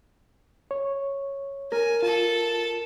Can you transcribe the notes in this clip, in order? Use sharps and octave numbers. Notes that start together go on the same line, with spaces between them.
C#5
A#4 G#5
F4 A4 A5